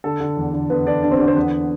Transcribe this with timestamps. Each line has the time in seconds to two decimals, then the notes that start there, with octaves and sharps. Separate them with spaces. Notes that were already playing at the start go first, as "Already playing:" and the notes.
0.04 D3 A4
0.20 D3
0.37 E2
0.54 D3
0.70 D3 B3 B4
0.86 D3 D4 D5
1.03 D3 D4 D5
1.11 C4 C5
1.20 D3 D4 D5
1.28 C4 C5
1.36 E2 B3 B4